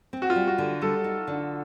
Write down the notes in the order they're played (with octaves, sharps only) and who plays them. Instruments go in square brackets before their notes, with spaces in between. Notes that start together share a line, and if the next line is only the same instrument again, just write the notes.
[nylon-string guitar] C4
[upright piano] F#4
F4
[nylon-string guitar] G3
[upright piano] F#4
[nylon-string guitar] D3
[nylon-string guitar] G3 [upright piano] A4
[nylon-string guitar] D#4
D3